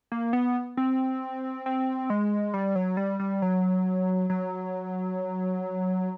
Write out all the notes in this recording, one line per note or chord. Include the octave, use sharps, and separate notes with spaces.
A#3
B3
C4
C4
G#3
G3
F#3
G3
G3
F#3
F#3